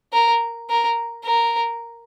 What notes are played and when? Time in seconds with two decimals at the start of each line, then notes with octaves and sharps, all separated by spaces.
0.13 A#4
0.70 A#4
1.25 A#4